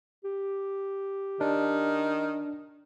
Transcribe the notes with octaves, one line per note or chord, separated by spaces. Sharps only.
G4
D#3 D4